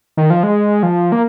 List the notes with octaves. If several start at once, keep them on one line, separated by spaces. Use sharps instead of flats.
D#3
F3
G#3
F3
A#3